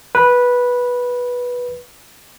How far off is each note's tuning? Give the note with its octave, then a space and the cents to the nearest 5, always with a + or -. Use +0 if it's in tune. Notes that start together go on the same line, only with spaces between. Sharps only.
B4 -10